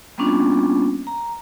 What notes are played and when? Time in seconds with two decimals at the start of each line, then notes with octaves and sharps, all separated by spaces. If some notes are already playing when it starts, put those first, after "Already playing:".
0.18 G3 A#3 B3 C#4 D4 F4
1.07 A#5